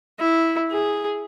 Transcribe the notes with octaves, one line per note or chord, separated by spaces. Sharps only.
E4
G#4